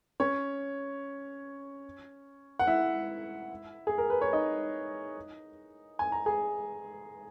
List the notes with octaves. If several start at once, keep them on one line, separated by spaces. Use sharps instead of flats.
C#4 C#5
F#5
E4 E5
G#4
A#4
B4
C#5
D#4 D#5
G#5
A#5
G#4 G#5